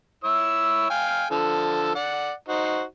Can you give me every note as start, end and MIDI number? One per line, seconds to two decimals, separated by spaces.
0.24 0.86 64
0.24 0.86 73
0.24 0.86 88
0.90 1.26 77
0.90 1.26 79
0.90 1.26 80
1.30 1.94 50
1.30 1.94 53
1.30 1.94 69
1.95 2.32 74
1.95 2.32 78
2.48 2.83 63
2.48 2.83 66
2.48 2.83 72